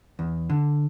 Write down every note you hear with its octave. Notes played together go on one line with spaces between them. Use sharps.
E2
D3